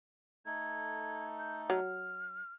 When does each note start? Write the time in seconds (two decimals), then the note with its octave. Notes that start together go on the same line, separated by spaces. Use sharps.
0.46 A3 D#4 A4 G#6
1.38 G6
1.70 F#3 F6